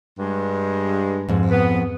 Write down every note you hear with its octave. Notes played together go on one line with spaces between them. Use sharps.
G2 G#3
F2 G#2
B3